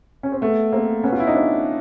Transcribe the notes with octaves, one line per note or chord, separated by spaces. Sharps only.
C#4
C4
A3 B3
A#3 C4
B3 C#4
F4
E4
D#4
C4 D4